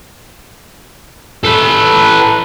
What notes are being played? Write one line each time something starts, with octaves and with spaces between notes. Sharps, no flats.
A4 B4